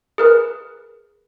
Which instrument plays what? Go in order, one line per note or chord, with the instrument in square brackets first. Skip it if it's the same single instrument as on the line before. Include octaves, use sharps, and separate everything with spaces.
[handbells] G#4 A#4 B4